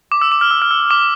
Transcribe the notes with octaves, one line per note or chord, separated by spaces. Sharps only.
D6
E6
D6
F6
E6
F6
E6
D6